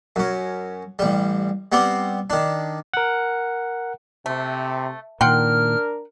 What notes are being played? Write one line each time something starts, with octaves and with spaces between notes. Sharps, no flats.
F#2 C#4
A1 G3
G3 B3 C4 D5 C6
D#3 D4
A#4 F#5
C3 A3
A#2 D#3 D4 A#4 F#5 G5 C6 F6